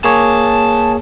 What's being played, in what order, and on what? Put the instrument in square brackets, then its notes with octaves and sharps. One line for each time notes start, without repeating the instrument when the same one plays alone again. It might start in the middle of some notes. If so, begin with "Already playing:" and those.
[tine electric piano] A#3 G#4 C#5 [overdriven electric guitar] A5